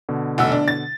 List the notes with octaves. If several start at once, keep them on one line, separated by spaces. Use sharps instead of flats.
B2 D3
F1 F#5 E6
D4
A6